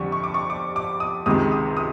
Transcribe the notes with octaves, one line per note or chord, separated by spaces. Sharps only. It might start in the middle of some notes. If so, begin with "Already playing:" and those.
Already playing: F2 D3 G3 C#6
C#6
D6
C#6
D6
D6
D#6
C#2 C3 D#3 G#3 D#6
D#6
D#6